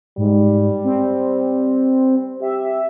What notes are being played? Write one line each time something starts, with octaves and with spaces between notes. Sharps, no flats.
G#2 G3
C4
G4 E5